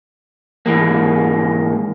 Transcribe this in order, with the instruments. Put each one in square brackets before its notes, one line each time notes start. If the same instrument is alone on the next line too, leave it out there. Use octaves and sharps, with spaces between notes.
[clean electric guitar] G#2 E3 G#3 A#3